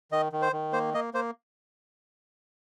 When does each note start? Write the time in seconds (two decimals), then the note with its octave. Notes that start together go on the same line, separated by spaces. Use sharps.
0.12 D#3 D#5
0.32 D#3
0.42 C5
0.52 D#3
0.73 A#3 C5
0.94 A#3 D#5
1.14 A#3 C5